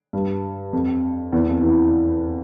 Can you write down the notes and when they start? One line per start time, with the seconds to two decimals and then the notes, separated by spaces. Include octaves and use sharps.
0.13 G2
0.73 F2
1.33 E2
1.48 F2
1.62 E3